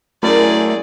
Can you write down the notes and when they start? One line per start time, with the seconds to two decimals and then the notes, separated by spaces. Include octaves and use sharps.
0.23 F#2 A3 E4 G#4 A#4 D5